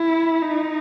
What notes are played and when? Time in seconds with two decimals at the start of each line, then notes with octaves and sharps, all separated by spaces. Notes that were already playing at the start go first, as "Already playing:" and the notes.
Already playing: E4
0.42 D#4